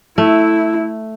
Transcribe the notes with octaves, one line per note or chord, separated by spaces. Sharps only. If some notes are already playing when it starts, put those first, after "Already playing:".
A3 E4